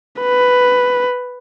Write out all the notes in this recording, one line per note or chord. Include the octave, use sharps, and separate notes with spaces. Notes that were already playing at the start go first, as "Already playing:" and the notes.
B4